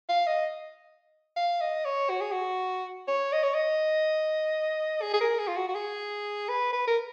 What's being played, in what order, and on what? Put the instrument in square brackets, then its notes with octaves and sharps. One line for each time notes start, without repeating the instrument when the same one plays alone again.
[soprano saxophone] F5
D#5
F5
D#5
C#5
F#4
G#4
F#4
C#5
D#5
C#5
D#5
G#4
G#4
A#4
G#4
F4
F#4
F#4
G#4
B4
B4
A#4